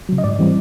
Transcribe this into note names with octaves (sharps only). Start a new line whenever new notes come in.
C#3 F#3
D#5
G#2 D5
E3 G3 C4